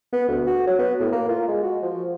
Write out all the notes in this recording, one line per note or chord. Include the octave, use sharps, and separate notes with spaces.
B3
D2
F#4
F#3
B3
A2
A#3
F4
G#3
F#4
F3